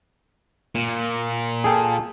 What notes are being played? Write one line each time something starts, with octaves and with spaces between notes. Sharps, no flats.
A#2
G#4 A4 G5